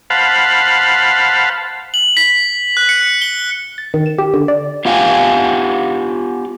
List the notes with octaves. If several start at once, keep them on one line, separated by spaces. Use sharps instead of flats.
C5 F5 F#5 A5 B5
F#7
B6
F#6
C#7
G7
A6
D#3
E7
G4
D3
D5
B3 F4 G4 F5 G5 G#5